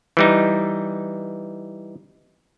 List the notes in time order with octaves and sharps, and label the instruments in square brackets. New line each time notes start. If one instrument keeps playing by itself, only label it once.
[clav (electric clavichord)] E3 G3 D#4